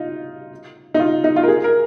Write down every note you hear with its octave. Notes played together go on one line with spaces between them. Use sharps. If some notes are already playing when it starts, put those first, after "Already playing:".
Already playing: D#4 F4
D#4
F4
D#4
F4
A#4
G#4
A#4